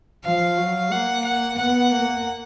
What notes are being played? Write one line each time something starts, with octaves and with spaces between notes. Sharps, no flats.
F3 F5
F#3
A#3 F#5
F#5
B3 F#5
A#3